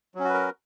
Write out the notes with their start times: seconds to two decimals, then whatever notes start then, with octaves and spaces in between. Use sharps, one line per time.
0.15 F#3
0.20 C#4
0.24 F#4
0.29 B4
0.34 A#4